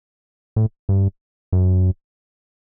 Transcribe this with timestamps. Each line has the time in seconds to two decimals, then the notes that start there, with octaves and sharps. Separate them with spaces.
0.56 A2
0.89 G2
1.53 F#2